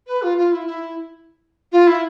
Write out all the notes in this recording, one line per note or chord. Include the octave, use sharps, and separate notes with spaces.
B4
F4
F4
E4
E4
F4
E4